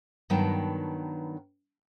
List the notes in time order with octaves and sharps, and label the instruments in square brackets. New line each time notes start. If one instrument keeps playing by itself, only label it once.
[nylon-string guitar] G2 D#3 F#3 B3 G5 A5